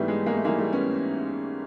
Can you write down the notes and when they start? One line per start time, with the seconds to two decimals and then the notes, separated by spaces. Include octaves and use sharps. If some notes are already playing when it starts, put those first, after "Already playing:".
Already playing: G#2 E3 G3 A3 B3
0.08 G#3
0.26 G#3 A#3
0.37 A3
0.45 G#2 E3 G3 G#3 A#3
0.59 G3 A3
0.73 B3 C#4